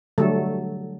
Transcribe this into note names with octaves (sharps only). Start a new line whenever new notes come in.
D3 F#3 G3 A3 A4